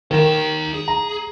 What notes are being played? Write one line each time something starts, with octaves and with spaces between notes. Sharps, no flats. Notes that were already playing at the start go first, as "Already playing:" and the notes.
D#3 D#4 A#4 F5 E7
G#4
A#5